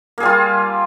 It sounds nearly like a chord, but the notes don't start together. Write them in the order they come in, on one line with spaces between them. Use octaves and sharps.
A#3 G#4 G3 F4